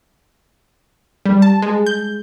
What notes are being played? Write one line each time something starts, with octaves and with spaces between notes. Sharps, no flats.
G3
A5
G#3
G6